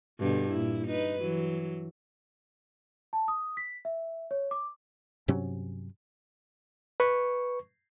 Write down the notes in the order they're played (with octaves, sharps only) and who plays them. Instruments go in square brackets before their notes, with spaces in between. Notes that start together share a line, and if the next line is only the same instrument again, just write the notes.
[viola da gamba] G2 B2 D3
A#2 E4
D#4 B4
E3 F#3
[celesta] A5
D#6
B6
E5
C#5
D6
[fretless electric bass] G2 C3 F#3 C#4
[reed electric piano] B4 C#6